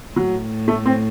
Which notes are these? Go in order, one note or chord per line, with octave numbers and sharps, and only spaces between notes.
A2 F#3
A3
C4